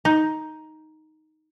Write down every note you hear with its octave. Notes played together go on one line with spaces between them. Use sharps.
D#4